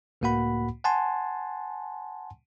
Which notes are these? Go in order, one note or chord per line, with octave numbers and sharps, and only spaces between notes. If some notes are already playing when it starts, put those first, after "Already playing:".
C#2 A2 A#3 F#4 F#5 B5
F#5 G#5 A5 C6